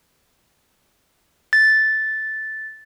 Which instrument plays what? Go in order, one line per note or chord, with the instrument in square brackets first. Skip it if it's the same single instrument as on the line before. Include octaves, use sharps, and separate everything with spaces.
[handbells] A6